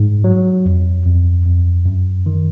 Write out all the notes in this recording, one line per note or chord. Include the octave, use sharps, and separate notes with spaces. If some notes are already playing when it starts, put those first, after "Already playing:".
Already playing: G#2
F#3
F2
F2
F2
F#2
D#3